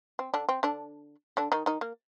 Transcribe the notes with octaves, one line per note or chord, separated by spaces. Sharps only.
C4
D3 D4
C4
D3 D4
D3 D4
D#3 D#4
D#3 D#4
A#3